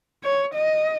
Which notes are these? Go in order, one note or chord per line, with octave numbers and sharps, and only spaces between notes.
C#5
D#5